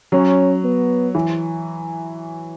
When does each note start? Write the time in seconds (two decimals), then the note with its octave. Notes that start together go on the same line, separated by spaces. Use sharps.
0.12 F#3 C#4
0.64 B3
1.15 E3